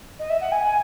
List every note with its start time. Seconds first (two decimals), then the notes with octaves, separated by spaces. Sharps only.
0.19 D#5
0.30 E5
0.41 F#5
0.52 G#5